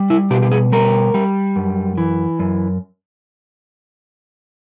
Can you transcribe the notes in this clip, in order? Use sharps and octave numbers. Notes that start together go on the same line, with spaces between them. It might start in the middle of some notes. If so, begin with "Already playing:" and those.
Already playing: G3
E4
B2 G4
G4
G#4
G3 A#4
G3
F#2
E3
F#2